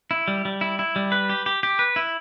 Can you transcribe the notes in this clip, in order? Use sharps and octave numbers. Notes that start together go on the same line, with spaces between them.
E4
G3
G3
E4
E4
G3
B4
G4
G4
G4
B4
E4